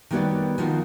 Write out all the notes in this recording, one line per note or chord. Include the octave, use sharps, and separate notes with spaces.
D#3 G3 B3 F#4 C#5 D5
D#3 F3 F4 F#4